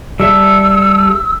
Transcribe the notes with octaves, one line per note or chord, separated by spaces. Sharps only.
G3 A4 E5 E6